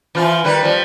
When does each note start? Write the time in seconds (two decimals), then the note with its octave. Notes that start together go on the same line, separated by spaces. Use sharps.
0.15 E3 F3 F4
0.44 D#3 G3 B4
0.62 F3 G3